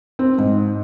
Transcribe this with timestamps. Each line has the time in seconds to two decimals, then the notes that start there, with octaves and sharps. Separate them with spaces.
0.19 C4
0.38 G#2